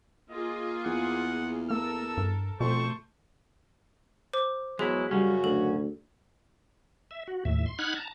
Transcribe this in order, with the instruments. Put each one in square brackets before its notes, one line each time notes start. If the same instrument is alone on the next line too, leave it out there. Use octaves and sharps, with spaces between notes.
[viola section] A#3 F4 G#4 [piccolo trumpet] D#5
[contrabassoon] E2 [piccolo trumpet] F#5
[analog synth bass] A#3 [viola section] A4 A#4 [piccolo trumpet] E6
[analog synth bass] G2
[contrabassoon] F2 [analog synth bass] B2 [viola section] A3 C5 [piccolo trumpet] C#6
[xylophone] C5 D6
[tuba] E2 [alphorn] F#3 [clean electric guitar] G#3 E4 [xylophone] G#4
[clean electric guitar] F#2 C#3 C#4 [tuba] G3 [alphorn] F#4
[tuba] D2 [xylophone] A4
[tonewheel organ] E5
F#4
D#2 A2 E5
C6
D#4 F#5 B5 F6 F#6 G#6
A5 A#5